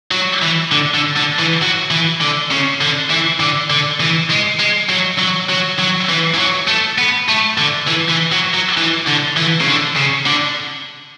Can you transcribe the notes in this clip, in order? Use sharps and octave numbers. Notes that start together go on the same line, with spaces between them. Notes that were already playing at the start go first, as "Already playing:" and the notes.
F#3
E3
D3
D3
D3
E3
F#3
E3
D3
C#3
D3
E3
D3
D3
E3
G#3
G#3
F#3
F#3
F#3
F#3
E3
E3
F#3
A3
B3
A3
D3
E3
E3
F#3
F#3
E3
D3
E3
C#3
D3
C#3
D3